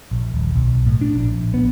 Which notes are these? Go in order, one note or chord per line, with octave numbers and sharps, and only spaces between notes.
A#1
D#1
B1
A2
D4
A#1
B3